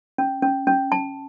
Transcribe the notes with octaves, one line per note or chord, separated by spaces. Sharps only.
C#4
C#4
C#4
A5